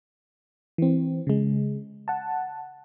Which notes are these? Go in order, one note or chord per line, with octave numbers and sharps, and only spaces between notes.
E3 C4
C#3 G#3
F#5 A5